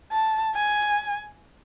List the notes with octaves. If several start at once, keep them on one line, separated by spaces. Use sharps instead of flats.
A5
G#5